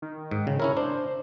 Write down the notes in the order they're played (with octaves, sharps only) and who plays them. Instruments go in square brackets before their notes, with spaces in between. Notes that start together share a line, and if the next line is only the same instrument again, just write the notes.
[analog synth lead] D#3
[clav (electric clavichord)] G#2
C#3
[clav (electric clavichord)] C#4 E4 A#4 [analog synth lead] C#5
[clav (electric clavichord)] D4 [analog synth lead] C5